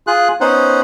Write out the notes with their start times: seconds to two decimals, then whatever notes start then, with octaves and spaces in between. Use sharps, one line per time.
0.07 F4 G#4 F#6
0.41 B3 C#4 D#4 C5 F#5